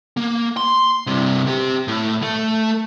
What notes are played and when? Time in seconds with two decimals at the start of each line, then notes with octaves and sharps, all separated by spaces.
0.17 A#3
0.57 C6
1.07 G2 C3
1.47 C4 G4
1.88 A2
2.23 A3